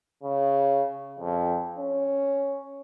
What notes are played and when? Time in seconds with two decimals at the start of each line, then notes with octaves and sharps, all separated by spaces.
0.23 C#3
1.19 F2
1.78 C#4